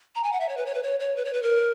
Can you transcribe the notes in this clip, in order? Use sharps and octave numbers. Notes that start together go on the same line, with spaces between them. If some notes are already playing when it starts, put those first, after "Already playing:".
A#5
G#5
F#5
E5
C#5
B4
C#5
B4
C#5
C#5
B4
C#5
B4
A#4